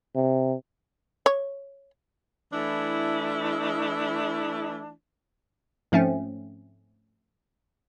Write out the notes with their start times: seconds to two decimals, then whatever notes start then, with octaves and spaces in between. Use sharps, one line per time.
0.15 C3
1.26 C#5
2.52 E3 A3 D4 E4
5.92 G#2 F3 A3 C4 C#4